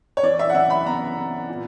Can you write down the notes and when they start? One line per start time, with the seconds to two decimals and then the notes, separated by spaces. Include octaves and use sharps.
0.17 C#5
0.23 E3 D5
0.39 E5
0.50 F#5
0.55 E3 E5
0.70 B5
0.86 B3 A#5
1.17 B3
1.49 A#2